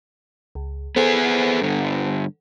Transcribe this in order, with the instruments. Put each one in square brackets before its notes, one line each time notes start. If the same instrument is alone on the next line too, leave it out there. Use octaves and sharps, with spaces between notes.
[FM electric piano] C#2
[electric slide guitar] B3 G#4 [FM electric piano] A4 C5 F#5
[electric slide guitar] G2 D3